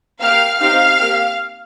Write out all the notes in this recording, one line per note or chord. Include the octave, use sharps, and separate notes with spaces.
A#3 G4 F5 F6
C4 D#4 G4 F5 F6
A#3 G4